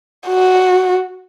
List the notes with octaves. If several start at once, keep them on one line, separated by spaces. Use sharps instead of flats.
F#4